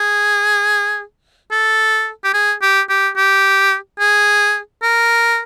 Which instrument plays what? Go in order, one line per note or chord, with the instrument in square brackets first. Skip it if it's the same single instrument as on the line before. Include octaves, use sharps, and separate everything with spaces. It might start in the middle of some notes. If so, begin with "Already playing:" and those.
Already playing: [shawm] G#4
A4
G4
G#4
G4
G4
G4
G#4
A#4